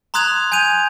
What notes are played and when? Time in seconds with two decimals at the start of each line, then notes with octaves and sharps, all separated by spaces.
0.14 A#5 C6 D#6 F#6 G#6 F7
0.52 G#5 G6 G#6 D#7 F7